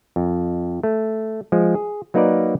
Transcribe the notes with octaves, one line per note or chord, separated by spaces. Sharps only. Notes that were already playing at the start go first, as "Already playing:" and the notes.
F2
A3
F3 G#3
G#4
F#3 A#3 D#4 A#4 B4 D5